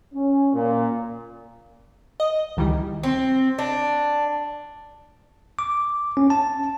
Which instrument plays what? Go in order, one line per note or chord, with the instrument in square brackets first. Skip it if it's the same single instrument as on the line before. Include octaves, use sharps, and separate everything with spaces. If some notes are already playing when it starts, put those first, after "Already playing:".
[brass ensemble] C#4
A#2
[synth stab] D#5
C#2 D#3 E3 G3
[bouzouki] C4
D4
[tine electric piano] D6
C#4
A5